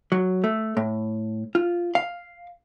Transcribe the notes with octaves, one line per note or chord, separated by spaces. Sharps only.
F#3
A3
A2
F4
F5